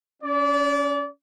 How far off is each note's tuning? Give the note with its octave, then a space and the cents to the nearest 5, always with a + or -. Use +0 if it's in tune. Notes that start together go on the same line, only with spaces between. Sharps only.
C#4 +20 D5 -30